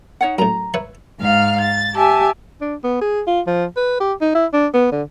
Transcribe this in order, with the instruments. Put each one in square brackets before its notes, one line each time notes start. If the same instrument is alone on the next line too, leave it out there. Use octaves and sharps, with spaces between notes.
[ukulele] D#4 C#5 F#5
[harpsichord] F#2 A2 [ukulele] A#5
[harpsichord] B4 C#5 E5
[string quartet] G#2 F5 F6
A6
G4 E5 G#5 A5
[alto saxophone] D4
B3
G#4
F4
F3
B4
G4
D#4
E4
D4
B3
D3